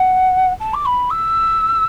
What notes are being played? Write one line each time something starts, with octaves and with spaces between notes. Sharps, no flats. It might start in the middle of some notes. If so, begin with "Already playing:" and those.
Already playing: F#5
A5
D6
B5
E6